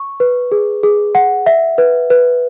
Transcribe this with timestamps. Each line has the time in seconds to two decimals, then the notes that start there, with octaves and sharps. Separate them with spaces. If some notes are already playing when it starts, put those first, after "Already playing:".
Already playing: C#6
0.20 B4
0.52 G#4
0.83 G#4
1.15 F#5
1.46 E5
1.78 B4
2.10 B4